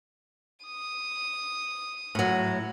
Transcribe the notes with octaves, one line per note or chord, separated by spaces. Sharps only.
D#6
A2 F#3